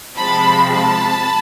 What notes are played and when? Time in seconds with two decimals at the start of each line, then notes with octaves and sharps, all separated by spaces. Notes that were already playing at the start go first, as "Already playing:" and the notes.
0.16 C3 F3 G#3 C4 A5 B5
0.73 A5 B5